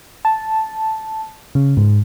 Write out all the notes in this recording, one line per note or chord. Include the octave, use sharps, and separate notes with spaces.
A5
C#3
G#2